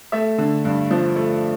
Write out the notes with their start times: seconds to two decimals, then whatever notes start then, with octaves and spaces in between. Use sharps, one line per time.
0.12 A3 E5
0.38 D3
0.65 G2
0.91 F3
1.16 A3